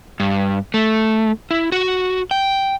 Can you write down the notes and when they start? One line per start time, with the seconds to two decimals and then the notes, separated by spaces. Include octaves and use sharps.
0.20 G2
0.74 A3
1.51 E4
1.72 F#4
2.31 G5